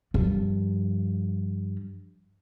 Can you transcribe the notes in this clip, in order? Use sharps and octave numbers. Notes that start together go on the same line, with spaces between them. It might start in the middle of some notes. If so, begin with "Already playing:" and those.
G2 F3